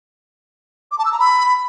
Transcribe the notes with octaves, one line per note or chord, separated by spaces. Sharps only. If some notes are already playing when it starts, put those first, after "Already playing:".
D6
A5
E6
A#5
B5